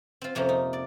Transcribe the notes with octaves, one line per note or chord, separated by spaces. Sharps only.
C4 F4
F2 C3 F3 A#3 C#4
D#4
D5